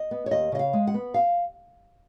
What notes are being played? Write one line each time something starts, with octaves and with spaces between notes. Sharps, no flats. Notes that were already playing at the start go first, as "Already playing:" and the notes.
Already playing: D#5
B3
C#5
D#2 D#5
C#3 D#5
F5
G#3
F#5
B3
F5